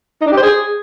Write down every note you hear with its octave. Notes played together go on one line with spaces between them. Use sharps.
D#4
D4
G4
C5
G#4